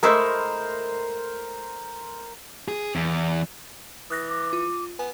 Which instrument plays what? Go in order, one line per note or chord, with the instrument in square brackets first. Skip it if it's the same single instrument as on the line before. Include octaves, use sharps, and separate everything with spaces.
[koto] G#3 A3 E4 [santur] A#4 C5
[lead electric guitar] G#4
E2
[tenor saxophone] E3 [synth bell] D#6 F#6 A#6
[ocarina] D6
[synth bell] F4
[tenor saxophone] B3 [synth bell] G#5